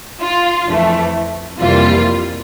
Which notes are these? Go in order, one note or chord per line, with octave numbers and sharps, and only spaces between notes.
F4
F2 E3 A3
F2 C3 E3 G3 A#3 F4